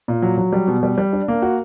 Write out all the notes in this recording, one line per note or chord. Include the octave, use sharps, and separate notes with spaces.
A#2
F#3
F#3
G3
B2
G3
G3
D4
A#3
F#4